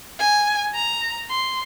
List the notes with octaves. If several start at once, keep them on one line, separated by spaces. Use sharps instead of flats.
G#5
A#5
C6